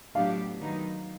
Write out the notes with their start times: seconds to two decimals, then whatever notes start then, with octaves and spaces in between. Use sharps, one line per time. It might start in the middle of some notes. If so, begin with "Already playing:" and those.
0.15 A2 F#3 B3 D4 G4 F5
0.60 D#3 F#3 B3 D#4